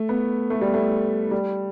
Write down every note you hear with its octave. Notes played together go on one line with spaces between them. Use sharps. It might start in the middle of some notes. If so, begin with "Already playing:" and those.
Already playing: A3
B3
A3
G3
A3
G3